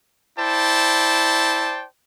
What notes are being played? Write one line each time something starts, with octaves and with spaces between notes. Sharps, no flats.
E4 C5 D5 G5 A5